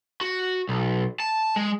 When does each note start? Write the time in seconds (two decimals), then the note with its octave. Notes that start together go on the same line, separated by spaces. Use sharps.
0.21 F#4
0.69 B1
1.20 A5
1.56 G#3